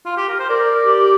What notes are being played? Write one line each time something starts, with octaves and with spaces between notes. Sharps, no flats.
F4
G4
A#4
C5
A#4 D5
G4